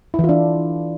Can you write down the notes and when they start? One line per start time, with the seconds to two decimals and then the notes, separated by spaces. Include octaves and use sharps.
0.14 E4
0.19 E3
0.24 F4
0.29 D4